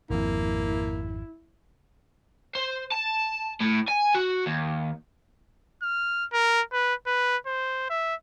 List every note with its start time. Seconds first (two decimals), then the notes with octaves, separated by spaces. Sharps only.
0.11 G#1 F2 A#3 E4
2.55 C5
2.92 A5
3.60 A2
3.88 G#5
4.15 F#4
4.46 D#2
5.82 F6
6.33 A#4
6.72 B4
7.06 B4
7.46 C5
7.90 E5